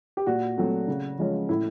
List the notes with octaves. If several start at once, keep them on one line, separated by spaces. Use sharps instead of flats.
G4
A#2 F#4
F#3 A3 C4
C#3
F3 G#3 C#4
A2 E4